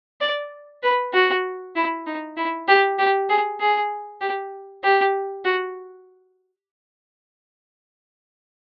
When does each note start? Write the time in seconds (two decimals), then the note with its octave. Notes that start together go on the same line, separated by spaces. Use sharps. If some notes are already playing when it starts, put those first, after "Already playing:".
0.21 D5
0.83 B4
1.14 F#4
1.76 E4
2.07 D#4
2.37 E4
2.68 G4
2.99 G4
3.30 G#4
3.60 G#4
4.21 G4
4.84 G4
5.45 F#4